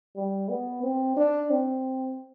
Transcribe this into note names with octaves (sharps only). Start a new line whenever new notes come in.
G3
B3
C4
D4
C4